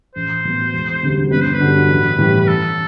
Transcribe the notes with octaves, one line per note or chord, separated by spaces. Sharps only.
A1 C5
A2 F#3 B3
E1
D2 C3 G3
G1 B4
C5
B4
G2 D3 F#3
A1
A2 E3 G3
B4
A1 A4